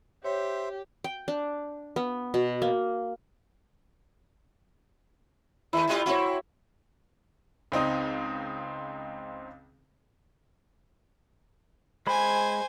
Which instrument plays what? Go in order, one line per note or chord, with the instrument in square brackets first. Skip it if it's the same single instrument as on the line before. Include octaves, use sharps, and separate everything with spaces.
[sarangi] G4 [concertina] C5 E5 [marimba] C#5
[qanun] G5
D4
B3
B2
A#3
[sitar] D#2 A3 [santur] E4
[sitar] A2 G3 F4
[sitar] C4 E4 [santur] F#4 C#5
[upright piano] C#2 C4 D#4 D#6
[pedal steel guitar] G#3 B5 [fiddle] C5 G#5